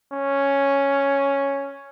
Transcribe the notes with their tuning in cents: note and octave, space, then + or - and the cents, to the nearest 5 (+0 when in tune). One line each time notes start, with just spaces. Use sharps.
C#4 +0